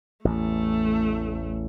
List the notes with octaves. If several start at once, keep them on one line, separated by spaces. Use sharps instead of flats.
A1 E2 A3